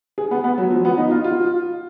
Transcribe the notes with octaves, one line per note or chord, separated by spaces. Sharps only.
G#4
B3
B3
F#3
F3
B3
D#4
F4
F4